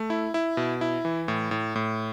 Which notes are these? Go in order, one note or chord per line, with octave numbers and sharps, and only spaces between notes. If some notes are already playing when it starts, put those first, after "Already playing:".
Already playing: A3
E4
E4
B2
E4
E3
A2
A2
A2